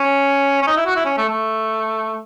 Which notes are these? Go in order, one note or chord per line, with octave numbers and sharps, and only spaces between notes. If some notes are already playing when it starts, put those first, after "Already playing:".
Already playing: C#4
C#4
D#4
E4
F#4
E4
C#4
A3
A3